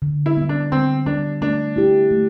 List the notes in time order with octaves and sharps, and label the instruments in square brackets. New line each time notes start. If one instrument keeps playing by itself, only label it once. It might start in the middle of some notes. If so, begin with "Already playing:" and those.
[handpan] D3
[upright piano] E4
[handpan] G3 B3
[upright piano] D4
[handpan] D3 [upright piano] C4
[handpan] G3 B3 [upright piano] D4
[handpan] A3 [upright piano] D4
[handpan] E4 G4
A3